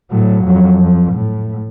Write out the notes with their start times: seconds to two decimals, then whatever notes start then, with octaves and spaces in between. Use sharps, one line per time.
0.10 A2 F#3
0.44 F2 F#3
0.79 F2
1.12 A2